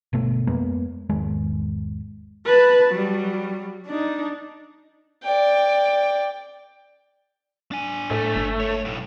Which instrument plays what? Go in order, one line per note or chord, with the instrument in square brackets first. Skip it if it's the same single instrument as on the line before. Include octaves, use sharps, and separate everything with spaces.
[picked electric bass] G1 B2 A3
F2 G#3 A#3 B3
G#1 E2 D#3 G#3
[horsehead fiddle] B4 A5
F#3 G3
D4 D#4
[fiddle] D5 G5
[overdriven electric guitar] D4 G#5
[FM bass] A2 [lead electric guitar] A3
[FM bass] G1
[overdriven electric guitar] A#4 C#5
B1 A2